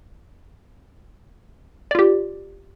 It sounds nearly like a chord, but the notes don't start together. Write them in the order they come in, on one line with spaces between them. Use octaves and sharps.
D5 F4 G4